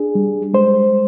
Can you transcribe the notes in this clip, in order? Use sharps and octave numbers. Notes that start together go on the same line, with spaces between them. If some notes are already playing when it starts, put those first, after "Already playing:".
Already playing: D4 G#4
G3
G#3 C5